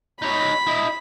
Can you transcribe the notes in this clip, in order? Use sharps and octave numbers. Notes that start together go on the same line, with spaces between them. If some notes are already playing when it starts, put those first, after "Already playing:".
D#4 C#5 B5
E4 D#5